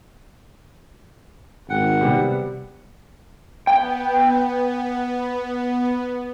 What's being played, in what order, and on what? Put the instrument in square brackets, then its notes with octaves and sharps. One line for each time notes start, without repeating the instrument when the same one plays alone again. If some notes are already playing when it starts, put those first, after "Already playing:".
[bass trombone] G#1 [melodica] F#5 [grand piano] G5
[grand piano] C3 G3 B3
[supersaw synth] B3 [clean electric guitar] G5